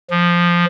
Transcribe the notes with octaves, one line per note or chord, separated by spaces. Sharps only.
F3